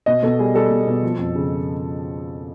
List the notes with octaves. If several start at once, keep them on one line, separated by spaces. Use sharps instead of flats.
B2 D#5
B2 A4
G3 G#4
G3 A4
B2
B2
F3
F2
C#3